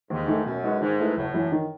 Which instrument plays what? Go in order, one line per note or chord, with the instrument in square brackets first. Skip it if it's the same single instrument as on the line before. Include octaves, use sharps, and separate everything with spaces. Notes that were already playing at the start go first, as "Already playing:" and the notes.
[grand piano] D#2 [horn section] G#2
[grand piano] D#3 A3
[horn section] F#2 [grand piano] B2
[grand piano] G#3 D#4 F#4 B4
[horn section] G#2 [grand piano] D#3
[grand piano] A3 E4 B4
[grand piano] F#1 [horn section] A2
[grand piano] F#2 E3
D#3